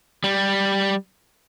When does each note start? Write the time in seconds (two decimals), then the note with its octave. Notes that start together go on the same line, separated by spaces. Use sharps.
0.24 G3